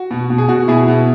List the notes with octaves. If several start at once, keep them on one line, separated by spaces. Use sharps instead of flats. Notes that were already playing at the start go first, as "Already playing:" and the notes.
Already playing: F#4
B2
B2
G#4
B2 F#4
B2 E4 G#4
B2